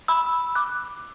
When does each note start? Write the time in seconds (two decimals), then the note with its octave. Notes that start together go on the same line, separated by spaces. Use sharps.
0.08 B5 E6
0.55 D6 F#6